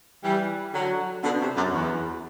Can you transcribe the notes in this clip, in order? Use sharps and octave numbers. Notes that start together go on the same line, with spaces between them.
E3 G3
D3 F#3
B2 D3
C3
F#2
E2